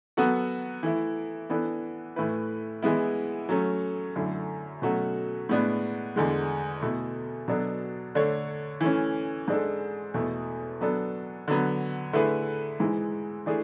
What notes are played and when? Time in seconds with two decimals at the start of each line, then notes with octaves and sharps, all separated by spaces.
0.17 F#3 B3 F#4 A4
0.83 E3 A3 E4
1.50 E3 B3 D4 A4
2.16 A2 E3 A3 E4 B4
2.82 E3 G#3 B3 E4
3.49 F#3 A3 C#4
4.16 F#2 D3 A3 E4
4.82 B2 F#3 A3 C#4 F#4
5.49 A2 G#3 B3 D4
6.16 E2 D3 G#3
6.81 B2 A3 E4 A4
7.48 B2 F#3 B3 D4 A4
8.15 D3 A3 D4 A4 C#5
8.81 E3 A3 C#4
9.48 G#2 G#3 D4 A4
10.14 E2 B2 A3 E4 A4
10.81 F#3 B3 D4 A4
11.48 D3 F#3 B3
12.13 D3 A3 E4 G#4 B4
12.80 G#2 E3 G#3
13.46 E3 A3 D4 G#4